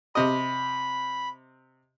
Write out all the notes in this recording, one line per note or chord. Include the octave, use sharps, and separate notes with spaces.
C3 D#5 B5